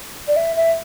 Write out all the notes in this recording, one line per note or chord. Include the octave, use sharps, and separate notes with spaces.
D5
E5
E5